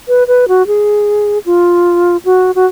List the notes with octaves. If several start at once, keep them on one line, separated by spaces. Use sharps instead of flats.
B4
B4
F#4
G#4
F4
F#4
F#4